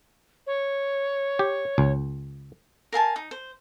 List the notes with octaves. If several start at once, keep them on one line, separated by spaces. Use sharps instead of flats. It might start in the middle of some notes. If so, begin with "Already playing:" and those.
C#5
G4
C#2
A#4 F5 G#5 A5
D#4
C5